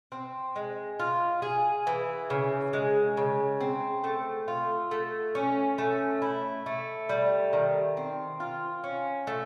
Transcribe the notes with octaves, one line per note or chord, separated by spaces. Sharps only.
C4
G#3
F4
G#4
E3
C#3
G#3
C#3
C4
A3
F4
A3
C#4
A3
E4
A3
G3
D#3
C4
F4
C#4
A3